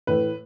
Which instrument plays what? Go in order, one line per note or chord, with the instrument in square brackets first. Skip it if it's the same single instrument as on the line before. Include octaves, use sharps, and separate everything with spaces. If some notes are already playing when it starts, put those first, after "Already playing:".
[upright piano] A2 E3 A3 B4